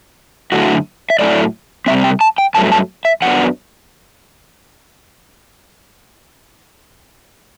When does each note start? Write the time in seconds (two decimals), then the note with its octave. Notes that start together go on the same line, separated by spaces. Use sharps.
0.52 F#2 D3 A3 E4 F#4
1.10 E5
1.19 A2 F#3 A3 E4 D5
1.86 C3 E3 G3 C4 E5
2.04 G5
2.21 A5
2.38 G5
2.55 G2 F#3 A3 A5
2.72 A5
3.05 E5
3.22 F#2 F#3 B3 D4 F#5